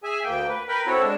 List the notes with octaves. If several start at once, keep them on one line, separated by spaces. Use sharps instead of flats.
G#4 E5 G#5
D2 A#3 G5
B4
A#4 B4 G5 B5
C4 E4 F#4 A4 C#5
G#3 D4